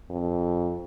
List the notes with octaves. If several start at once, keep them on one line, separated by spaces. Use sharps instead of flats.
F2